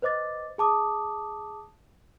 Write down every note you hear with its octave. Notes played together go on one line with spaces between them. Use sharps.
B4 C5 D#5 D6 A6
G#4 A5 D6 D#6